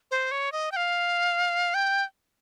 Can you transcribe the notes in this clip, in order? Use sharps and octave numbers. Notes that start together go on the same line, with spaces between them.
C5
C#5
D#5
G5
F5
G5